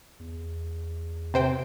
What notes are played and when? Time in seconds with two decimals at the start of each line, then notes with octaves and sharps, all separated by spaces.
0.20 E2
1.34 C3 C5 G5